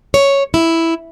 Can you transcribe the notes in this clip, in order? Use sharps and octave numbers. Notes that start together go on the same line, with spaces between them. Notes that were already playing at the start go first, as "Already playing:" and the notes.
C#5
E4